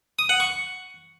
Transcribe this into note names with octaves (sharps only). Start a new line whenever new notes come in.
D#6
F#5
C#6